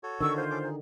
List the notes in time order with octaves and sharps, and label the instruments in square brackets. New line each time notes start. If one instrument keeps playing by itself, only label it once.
[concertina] F#4 A4 C#5
[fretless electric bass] D3 D#3 [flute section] C#6 E6
[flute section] F4 C5
[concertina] C#4 A4 D6
D#4 G#4